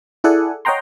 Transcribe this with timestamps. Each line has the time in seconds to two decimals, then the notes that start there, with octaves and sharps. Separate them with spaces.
0.24 E4 G#4 A4 D5 F#5 G#5
0.65 C#5 D#5 F#5 G5 A#5 C6